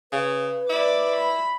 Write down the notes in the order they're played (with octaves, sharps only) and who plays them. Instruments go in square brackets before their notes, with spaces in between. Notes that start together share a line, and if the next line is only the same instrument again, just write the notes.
[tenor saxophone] C#3 [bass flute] B4
[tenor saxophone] E4 [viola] D5 D6
[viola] B5